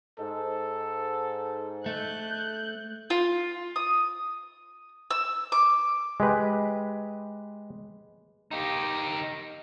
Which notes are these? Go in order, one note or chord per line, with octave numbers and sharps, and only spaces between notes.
G#2 A4
A3 F#6 G6
F4
D#6
E6
D6
G#3 G4 B4
D#4 G4